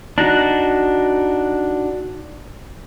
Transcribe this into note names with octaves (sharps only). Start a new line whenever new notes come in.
D4 D#4 F#4